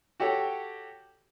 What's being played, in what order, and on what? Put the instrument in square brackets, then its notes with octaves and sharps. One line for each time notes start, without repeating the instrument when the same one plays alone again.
[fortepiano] F#4 G4 A4 C#5 G5